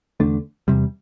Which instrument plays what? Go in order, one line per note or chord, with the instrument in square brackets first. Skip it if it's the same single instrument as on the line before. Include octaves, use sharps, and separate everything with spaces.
[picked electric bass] E2 D3 A3 D4
E2 C3 G3